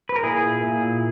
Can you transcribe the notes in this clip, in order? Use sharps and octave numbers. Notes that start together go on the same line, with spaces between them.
B4
A#4
A#2 E4 G#4
A#2